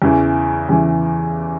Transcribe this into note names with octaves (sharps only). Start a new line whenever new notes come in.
E2 C#3 E3
E2 C#3 E3